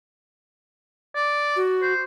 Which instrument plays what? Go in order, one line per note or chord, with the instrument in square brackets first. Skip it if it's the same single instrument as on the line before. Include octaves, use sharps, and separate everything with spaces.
[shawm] D5
[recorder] F#4
[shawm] C5